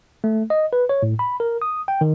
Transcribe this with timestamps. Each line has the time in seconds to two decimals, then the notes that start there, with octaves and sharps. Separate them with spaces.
0.24 A3
0.50 D#5
0.73 B4
0.89 C#5
1.03 A2
1.19 B5
1.40 A#4
1.62 D#6
1.88 G5
2.01 D#3